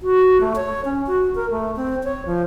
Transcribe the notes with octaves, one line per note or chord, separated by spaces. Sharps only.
F#4
A3
C#5
C#4
F#4
A#4
A3
C4
C#5
F3